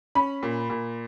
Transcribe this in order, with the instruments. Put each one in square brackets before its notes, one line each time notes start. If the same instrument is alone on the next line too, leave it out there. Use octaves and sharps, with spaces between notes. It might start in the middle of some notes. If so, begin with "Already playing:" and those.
[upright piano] C#4 B5
A#2
A#2